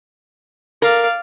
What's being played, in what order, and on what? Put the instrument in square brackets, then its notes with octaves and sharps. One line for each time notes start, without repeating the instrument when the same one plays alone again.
[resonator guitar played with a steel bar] A#4 [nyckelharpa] D5 F5